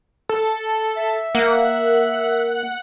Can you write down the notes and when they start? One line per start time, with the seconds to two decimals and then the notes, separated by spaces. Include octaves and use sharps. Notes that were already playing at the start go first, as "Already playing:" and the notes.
0.29 A4
0.97 E5
1.35 A#3 F#5